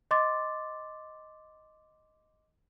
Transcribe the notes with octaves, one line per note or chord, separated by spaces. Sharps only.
D#5 C6 D6 A6